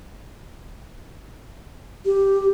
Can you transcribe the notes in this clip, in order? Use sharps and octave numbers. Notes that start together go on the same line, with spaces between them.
G4